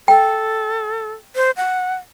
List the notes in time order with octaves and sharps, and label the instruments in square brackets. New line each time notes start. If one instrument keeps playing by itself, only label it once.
[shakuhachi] A4 [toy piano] G5
[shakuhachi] C5
F#5